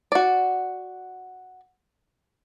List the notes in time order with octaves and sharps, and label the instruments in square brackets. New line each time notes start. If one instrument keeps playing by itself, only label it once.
[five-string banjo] F#4 D5